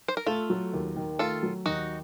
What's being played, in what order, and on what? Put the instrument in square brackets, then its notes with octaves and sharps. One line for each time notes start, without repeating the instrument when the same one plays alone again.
[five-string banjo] C5
A#4
[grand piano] A3 [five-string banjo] F4 A4
[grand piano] F#3
D#2
D#3
[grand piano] A3 [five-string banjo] F4 A4
[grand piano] F#3
[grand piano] D#2 [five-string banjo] D#4 F#4